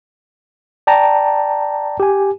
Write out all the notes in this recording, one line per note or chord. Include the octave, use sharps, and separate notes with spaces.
D5 G5 A5 A#5
G4 G#5